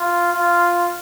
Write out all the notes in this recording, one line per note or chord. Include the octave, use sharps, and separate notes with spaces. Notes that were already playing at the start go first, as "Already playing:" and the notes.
Already playing: F4
F4